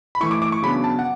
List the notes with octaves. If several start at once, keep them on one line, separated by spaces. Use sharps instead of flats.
B5
E3 A3 E4 C#6
D6
D6
C#6
C#3 F#3 B3 D4 B5
A5
F#5